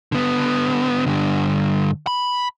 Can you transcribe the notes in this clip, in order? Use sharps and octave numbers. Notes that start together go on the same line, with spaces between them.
D3 B3
G2 D3
B5